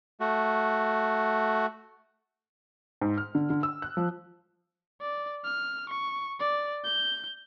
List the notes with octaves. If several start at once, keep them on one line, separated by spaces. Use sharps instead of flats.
A3 F#4
G#2
F6
D3
D3
E6
F#6
F3
D5
F6
C#6
D5
G6